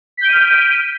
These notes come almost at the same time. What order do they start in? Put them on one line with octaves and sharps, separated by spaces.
B6 G6 D7 D#7 F6